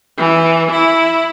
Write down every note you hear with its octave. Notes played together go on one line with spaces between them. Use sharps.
E3
E4